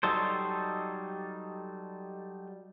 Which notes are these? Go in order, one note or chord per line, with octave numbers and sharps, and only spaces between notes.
F#3 G3 D#4 A4 C5